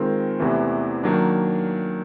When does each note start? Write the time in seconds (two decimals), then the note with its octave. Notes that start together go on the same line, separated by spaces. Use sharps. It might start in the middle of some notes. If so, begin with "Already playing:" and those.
Already playing: D#3 G#3 C4 F4 A#4
0.40 E2 C3 E3 A3
1.03 D#3 F#3 A#3 D4